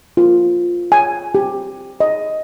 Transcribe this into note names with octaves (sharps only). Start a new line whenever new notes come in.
F4
G#5
G4
D#5